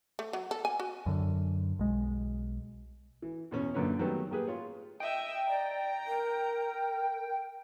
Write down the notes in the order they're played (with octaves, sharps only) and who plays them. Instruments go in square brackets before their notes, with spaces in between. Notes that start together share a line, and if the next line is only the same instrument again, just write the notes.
[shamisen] A3
F#3
A4
G#5
F#4
[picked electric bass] F#2 D3
B1 G#3
[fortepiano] E3
E2 B2 C#4
F#2 A#2 D3 B4 C#5
D#3 F#3 G3 A3 B3
A#3 G4 G#4 B4
F4 C#5
[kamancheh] D#5 E5 [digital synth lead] G5
[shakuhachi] D5 [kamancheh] A#5
[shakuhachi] A#4